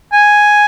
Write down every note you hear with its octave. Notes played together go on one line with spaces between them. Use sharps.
G#5